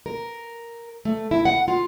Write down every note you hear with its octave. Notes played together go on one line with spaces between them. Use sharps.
A#4
A3
E4
F#5
F4